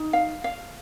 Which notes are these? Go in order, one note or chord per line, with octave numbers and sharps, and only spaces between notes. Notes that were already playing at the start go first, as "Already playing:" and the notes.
Already playing: D#4
F5
F5